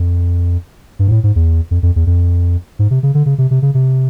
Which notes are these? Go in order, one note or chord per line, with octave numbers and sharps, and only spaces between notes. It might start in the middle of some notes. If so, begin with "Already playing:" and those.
Already playing: F2
G2
G#2
A2
G#2
E2
F2
F2
E2
F2
G#2
C3
C#3
D3
C#3
C3
C3
C#3
C3